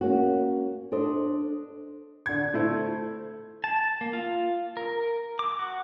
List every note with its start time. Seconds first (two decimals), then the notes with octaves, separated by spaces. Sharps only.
0.01 A#3 C#4 F#4
0.92 D4 A4 C5 D#5
2.26 D3 G#6
2.54 A3 E4 C5
3.64 A5
4.01 A#3
4.13 F4
4.77 A#4
5.39 D6
5.59 F#4